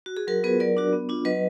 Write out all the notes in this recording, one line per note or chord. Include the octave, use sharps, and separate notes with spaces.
F#4
G#4
F#3 F#4 A#4
B3 F4 G#4 B4
F#3 A#4 D5
D4 F#4
B3
D4 F4
F#3 B4 D#5